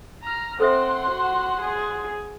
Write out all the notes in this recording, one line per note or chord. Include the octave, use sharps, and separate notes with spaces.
A#5 F6
C4 A4 C5 E5 F#5 C6
F#4
G#4